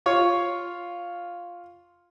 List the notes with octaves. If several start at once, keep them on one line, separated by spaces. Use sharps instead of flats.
F4 C#5